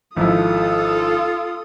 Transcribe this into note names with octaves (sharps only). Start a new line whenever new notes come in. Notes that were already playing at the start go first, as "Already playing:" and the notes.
G#1 F3 E4 F4 A4 D#6